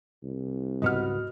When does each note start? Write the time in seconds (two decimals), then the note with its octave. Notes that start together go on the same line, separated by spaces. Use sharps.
0.24 C2
0.82 C#2 G#2 B3 F#4 D#5 F6